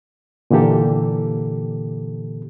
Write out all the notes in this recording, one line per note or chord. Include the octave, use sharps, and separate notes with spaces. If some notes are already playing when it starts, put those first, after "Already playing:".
A#2 D3 E3 A#3 G4 A4